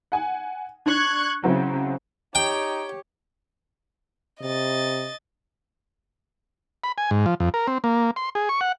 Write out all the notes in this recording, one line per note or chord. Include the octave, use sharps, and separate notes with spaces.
F#5 G#5
D4 C#6 F#6 G#6
C#3 F#3 C4 E4
D#4 G4 C#5 G5
C3 D#5 A6
B5
G#5
G#2
F3
F2
A#4
C4
A#3
C6
G#4
C#6
F#5